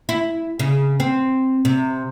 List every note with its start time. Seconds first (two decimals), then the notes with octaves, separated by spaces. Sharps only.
0.09 E4
0.59 C#3
1.00 C4
1.65 C3